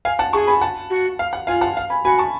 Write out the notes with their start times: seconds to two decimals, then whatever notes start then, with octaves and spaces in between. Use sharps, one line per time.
0.05 F5 G#5
0.19 F#5 A5
0.33 G#4 A5 C#6
0.47 G#5 B5
0.62 F#5 A5
0.90 F#4
1.19 F5
1.33 F#5
1.47 F4 F5 G#5
1.61 F#5 A5
1.77 F5
1.90 G#5 B5
2.04 F#4 G#5 B5
2.18 A5 C#6